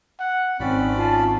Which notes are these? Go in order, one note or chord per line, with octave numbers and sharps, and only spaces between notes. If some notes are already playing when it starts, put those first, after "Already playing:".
F#5
G#1 C4 C#4 F#4 D5 B5
F4 A5